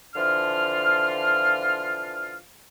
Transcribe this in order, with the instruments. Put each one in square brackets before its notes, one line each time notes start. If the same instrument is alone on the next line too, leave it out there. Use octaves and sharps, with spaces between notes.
[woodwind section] D3 E3 F3 F4 F6